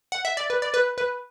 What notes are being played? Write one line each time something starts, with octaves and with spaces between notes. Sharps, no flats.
F#5
E5
D5
B4
D5
B4
B4